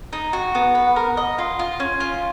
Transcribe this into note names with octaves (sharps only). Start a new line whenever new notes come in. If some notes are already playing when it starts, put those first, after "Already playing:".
D#4
F#4
B3
B4
A#4
D#5
F4
F4
C#4
F4